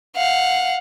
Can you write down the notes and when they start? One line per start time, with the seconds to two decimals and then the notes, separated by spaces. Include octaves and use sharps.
0.16 F5 F#5